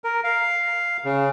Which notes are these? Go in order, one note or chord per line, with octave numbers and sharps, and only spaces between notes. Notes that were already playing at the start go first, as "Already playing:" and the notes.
A#4
F5
C#3